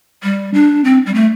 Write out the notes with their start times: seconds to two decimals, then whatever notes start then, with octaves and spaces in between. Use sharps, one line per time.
0.23 G3
0.54 D4
0.84 C4
1.06 G3
1.14 A3